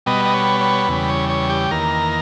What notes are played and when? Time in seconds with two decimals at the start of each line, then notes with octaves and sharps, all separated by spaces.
0.06 B2 G3 B3 D#5
0.25 D#5
0.34 C#5
0.61 C#5
0.88 E2 C#3 G3 B4
1.09 C#5
1.29 C#5
1.50 G4
1.71 E2 D#3 A#3 A#4